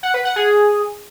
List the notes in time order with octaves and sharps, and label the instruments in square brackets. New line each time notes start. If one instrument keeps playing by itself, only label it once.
[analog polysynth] F#5
B4
F#5
G#4